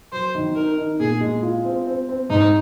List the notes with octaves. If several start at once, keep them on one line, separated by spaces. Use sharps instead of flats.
F#3 C5
D#3
D#4 A#4
D#4
A#2 G#4
G#3
F4
C4
C4
C4
G#2 D#4